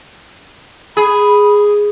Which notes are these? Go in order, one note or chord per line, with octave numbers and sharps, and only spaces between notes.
G#4 B5